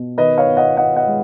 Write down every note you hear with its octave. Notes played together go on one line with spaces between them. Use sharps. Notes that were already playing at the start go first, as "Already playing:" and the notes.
Already playing: B2
D#3 B4 D#5
C#5 F5
B3
D#5 F#5
D#4 D#5 F#5
D#5 F#5
G#3